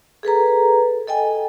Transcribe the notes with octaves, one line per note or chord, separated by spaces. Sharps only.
G#4 A4 B4 A#5
A4 D#5 G5 G#5